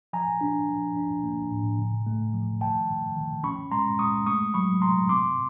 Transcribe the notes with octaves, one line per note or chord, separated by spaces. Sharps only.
F3 G#5 A#5
D4
F3
D4
A#3
A2
C#3
A3
F3
D#3 G5 A5
D#3
D#3
C#4 B5 C#6
G#3 A#5 C6
G#3 C#6 D#6
A3 C#6 D#6
F#3 B5 C#6
C3 A#5 C6
C4 C6 D6